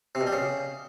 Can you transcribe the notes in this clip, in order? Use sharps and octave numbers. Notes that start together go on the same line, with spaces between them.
C3
B2
G3
C#3